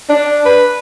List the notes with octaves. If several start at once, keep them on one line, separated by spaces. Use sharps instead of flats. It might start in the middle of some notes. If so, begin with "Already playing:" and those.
D4
B4